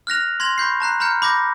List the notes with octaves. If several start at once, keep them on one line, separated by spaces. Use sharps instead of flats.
F6 F#6 A#6 F7
C6 G#6 A#6 F7
B5 C#6 G6 C7
A5 A#5 F#6 C7
A#5 B5 F6 G6 C#7
B5 D6 G6 A#6